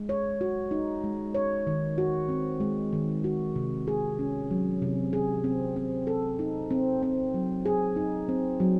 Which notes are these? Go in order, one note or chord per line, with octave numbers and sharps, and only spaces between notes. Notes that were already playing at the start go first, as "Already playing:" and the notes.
Already playing: G#3
C#5
F#4
D#4
G#3
C#5
D#3
F#4
C4
G#3
D#3
F#4
C3
G#4
C#4
F#3
C3
G#4
C4
C4
A4
D#4
C4
C4
F#3
G#4
D#4
C4
F#3